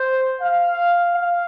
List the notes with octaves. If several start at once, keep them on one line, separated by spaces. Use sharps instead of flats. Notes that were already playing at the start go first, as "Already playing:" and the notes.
Already playing: C5
F5
F5